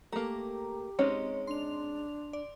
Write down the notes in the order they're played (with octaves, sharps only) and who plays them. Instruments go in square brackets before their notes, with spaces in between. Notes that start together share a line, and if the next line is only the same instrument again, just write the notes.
[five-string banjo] A3 A#3 [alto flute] G4 [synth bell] A#5
[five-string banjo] G#3 C#4 D#4 [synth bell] C4 C#5
[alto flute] D4 [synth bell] C6 F7
[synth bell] D5